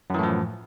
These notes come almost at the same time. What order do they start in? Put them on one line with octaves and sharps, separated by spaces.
F#2 E3 A2 F3